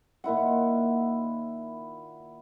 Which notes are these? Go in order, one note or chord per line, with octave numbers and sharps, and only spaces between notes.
A#2 D#3 E4 F#5